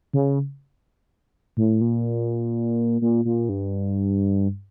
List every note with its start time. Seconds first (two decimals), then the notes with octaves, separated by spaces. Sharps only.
0.13 C#3
1.57 A2
1.81 A#2
3.01 A#2
3.25 A#2
3.49 G2